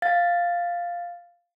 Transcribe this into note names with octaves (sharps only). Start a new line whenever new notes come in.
F5 A6